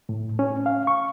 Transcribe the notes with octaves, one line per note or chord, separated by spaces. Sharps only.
A2
C#4
F5
C#6